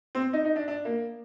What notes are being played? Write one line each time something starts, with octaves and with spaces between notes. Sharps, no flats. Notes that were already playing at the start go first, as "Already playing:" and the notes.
C4
D#4
D#4
D4
D4
A#3